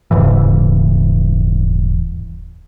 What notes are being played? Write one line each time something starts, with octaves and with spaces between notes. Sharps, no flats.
D#1 G#2 C#3 E3